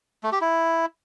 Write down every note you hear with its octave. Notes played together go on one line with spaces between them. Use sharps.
A3
G4
E4